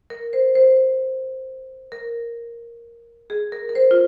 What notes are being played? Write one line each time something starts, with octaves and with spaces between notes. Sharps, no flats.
A#4
C5
C5
A#4
G#4
A#4
A#4
C5
F4